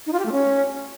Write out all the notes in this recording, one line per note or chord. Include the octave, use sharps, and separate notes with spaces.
D#4
F4
G4
A3
C#4